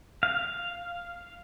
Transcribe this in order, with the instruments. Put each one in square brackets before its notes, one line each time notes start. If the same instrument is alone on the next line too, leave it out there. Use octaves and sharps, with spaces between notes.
[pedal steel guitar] F5